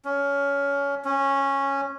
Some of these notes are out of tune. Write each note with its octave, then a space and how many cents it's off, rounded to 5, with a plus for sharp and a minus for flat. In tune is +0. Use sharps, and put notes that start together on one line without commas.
C#4 +20
C#4 -10